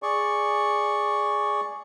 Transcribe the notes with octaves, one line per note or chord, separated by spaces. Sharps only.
G#4 D5 C#6